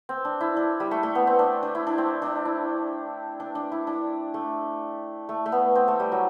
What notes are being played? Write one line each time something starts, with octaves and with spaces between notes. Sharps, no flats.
C4
D4
E4
D4
G3
A3
A3
B3
C4
D4
D4
E4
D4
C4
D4
E4
D4
D4
E4
D4
A3
A3
A3
B3
C4
A3
G3
F#3